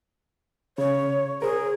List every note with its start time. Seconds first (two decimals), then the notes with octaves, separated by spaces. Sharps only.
0.78 C#3 C#5
1.42 G#4 A#4 C5